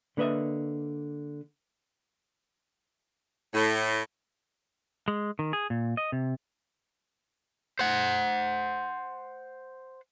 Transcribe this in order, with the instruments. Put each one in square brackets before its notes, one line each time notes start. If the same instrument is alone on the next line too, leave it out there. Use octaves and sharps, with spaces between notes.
[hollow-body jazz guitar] D3 A#3 B4 D#5 E5
[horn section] A2
[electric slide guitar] G#3
D#3
G#4
A#2
D#5
C3
[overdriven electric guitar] C5 F#5